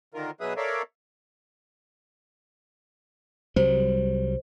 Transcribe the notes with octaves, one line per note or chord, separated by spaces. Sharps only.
D3 D#3 F4 A#4
B2 F#3 G#4 B4 E5 D#6
A4 A#4 C#5 D5 E5 F5
C2 F#3 G3 C5